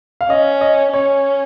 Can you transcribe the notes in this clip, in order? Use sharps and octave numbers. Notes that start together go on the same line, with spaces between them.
F5
C#4 D#5
D#5
C#4 C#5